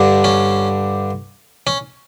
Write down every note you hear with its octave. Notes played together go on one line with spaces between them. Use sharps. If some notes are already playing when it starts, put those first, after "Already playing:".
Already playing: G2 D3
C#4
C#4